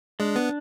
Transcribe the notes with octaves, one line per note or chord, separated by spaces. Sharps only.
G#3 D4
B3